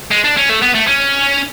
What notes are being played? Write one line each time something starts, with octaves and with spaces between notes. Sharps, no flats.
G#3
D4
C#4
A3
B3
A3
C#4